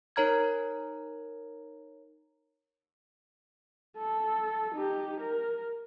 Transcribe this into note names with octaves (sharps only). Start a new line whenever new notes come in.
D#4 A#4 C#5 A#5 F6 G#6
A4
D#4 G4
A#4